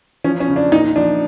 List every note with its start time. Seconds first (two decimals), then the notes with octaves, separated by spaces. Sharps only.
0.24 F3 C#4
0.40 C#4
0.48 C#3
0.56 D4
0.72 A#2 D#4
0.96 F3 D4